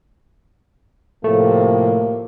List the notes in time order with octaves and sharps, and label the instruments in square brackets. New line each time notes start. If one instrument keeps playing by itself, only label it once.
[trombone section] A2 C3 F3 [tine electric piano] A3 [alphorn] A#3